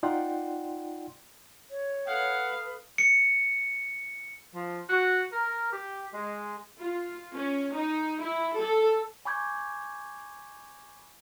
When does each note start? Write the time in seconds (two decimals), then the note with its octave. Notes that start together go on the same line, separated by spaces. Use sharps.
0.03 D#4 F4 D5 F#5 G5 C6
1.70 C#5
2.07 A4 B4 F5 F#5 D#6
2.98 C#7
4.54 F3
4.89 F#4
5.32 A#4
5.71 G4
6.13 G#3
6.80 F4
7.36 C#4
7.75 D#4
8.23 E4
8.57 A4
9.25 G#5 B5 C#6 D6 G6 G#6